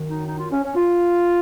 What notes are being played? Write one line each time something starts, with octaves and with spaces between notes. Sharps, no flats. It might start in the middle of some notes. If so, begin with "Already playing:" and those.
Already playing: F#2 D#3
D#4
D#4
F4
C#4
C#4
F4